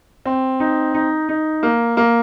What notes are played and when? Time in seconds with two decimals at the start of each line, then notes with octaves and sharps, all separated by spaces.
0.25 C4
0.60 D#4
0.94 D#4
1.29 D#4
1.63 A#3
1.97 A#3